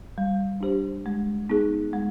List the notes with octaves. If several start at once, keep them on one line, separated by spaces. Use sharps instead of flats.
G3
D4 G4 C5
G#3
B3 D#4 G#4
G#3